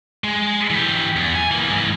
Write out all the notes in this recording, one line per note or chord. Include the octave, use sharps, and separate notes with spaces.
G#3
E3 G4
E2
G#5
E3 A#3
G#2 E3